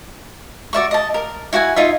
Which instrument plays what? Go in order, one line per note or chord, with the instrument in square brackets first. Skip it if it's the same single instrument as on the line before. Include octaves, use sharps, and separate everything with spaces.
[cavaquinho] F#4 D5 E5 C#6
D#5 A5
A#4
E4 F#4 F#5 G#5
D#4 F4 E5